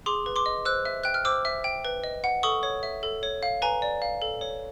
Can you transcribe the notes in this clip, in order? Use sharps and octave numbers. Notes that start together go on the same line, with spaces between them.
G#4 C6 D6
B4
C6 D6
D#5
C5 E6 F#6
E5
G5 F#6
F6
C5 D6 E6
E5
G5
B4
D#5
F#5
A4 C#6 D#6
C#5
E5
A4
C#5
F5
B4 G#5 A#5
D5
F5
A4
C#5